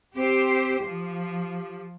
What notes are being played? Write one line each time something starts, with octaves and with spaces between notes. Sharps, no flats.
C4 G4 C5
F3 G4